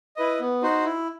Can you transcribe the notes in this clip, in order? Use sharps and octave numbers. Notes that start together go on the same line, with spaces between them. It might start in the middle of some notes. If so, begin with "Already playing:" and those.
E4 B4 D#5
B3
D#4 F#4 C5
E4